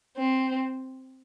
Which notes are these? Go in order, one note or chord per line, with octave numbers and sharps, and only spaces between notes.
C4